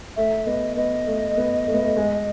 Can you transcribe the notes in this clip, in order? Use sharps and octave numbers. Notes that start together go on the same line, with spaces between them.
A3 E5
B3 D#5
B3 D#5
A3
B3
A3
B3
A3
G#3